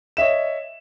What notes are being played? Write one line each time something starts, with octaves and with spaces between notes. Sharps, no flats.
C#5 D#5 E5 E7